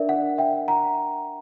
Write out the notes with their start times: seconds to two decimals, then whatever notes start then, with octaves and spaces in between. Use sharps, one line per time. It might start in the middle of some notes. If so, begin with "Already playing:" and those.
Already playing: D4 A#4 D5 E5
0.09 F#5
0.38 E5 G5
0.68 F#5 A#5